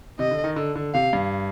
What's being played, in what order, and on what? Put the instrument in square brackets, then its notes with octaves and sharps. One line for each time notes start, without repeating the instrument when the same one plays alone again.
[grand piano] C3 [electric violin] D#5
[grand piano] D3
D#3
D3
D3
[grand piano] C3 [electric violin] F5
[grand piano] G2